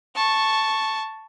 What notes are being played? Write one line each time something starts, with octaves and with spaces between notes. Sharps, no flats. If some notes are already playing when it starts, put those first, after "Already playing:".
A5 C#6